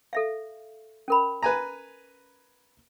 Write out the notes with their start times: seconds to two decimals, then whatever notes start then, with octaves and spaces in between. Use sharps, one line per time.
0.13 A4 E5 F5
1.08 C#4 A#4 B5
1.43 B4 G#5 A#5